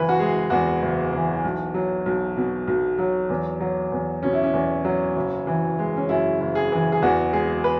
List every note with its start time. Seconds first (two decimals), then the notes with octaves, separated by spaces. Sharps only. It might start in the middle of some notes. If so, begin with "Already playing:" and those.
Already playing: F#1 E3 B4
0.09 F#4
0.19 G#3 G#4
0.50 E2 F#4
0.82 F#1
1.13 E3
1.44 B1
1.74 F#3
2.06 B1
2.37 B2
2.67 B1
2.98 F#3
3.29 E2
3.61 F#3
3.92 E2
4.23 B2 C#4
4.33 E4
4.43 C#4
4.54 E2
4.85 F#3
5.16 F#1
5.47 E3
5.79 G#3
5.97 C#4
6.09 F#2 E4
6.40 F#1
6.55 G#4
6.72 E3
6.92 G#4
7.02 E2 F#4
7.33 G#3 G#4
7.64 B4